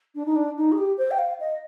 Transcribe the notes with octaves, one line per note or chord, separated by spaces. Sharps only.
D4
D#4
D4
D#4
G#4
G4
C5
G5
F5
D#5